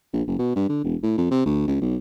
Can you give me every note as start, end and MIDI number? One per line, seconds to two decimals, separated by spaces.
0.13 0.22 34
0.27 0.38 30
0.39 0.55 47
0.56 0.69 43
0.69 0.79 50
0.84 0.96 28
1.03 1.13 45
1.18 1.31 41
1.31 1.45 48
1.46 1.66 38
1.67 1.81 37
1.82 1.96 35